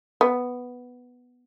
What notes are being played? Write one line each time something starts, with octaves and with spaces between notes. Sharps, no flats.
B3